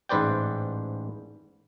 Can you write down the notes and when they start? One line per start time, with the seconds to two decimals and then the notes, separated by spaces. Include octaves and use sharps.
0.09 A1 G#2 B4 C5 D5 G5